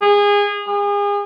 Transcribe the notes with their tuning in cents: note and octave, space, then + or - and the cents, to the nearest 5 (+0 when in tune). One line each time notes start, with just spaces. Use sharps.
G#4 -25
G#4 -35